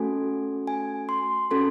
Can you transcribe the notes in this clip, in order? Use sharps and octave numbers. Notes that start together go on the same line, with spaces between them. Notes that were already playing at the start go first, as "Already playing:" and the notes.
Already playing: A3 C#4 F#4 A4 G#5
G#5
C6
C#4 F#4 A4 C6